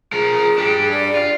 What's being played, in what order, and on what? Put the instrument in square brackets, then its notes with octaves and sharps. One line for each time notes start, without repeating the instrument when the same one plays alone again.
[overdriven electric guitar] F3 A#4 [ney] G#4
[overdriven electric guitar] D4 G4
[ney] D5
[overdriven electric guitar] F4